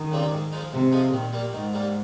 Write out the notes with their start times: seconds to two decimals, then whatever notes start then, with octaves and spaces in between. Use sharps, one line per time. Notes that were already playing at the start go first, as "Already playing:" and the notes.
Already playing: D#3
0.12 C#3 G3 C4 G4
0.31 G#2
0.52 F3 G#3 D#4
0.72 G#2 C3
0.92 F3 G#3 D#4
1.12 A#2 D#3
1.33 G3 A#3
1.53 G#2 D#3
1.74 G3 A#3